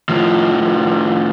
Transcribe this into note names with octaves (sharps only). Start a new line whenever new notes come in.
A2 F3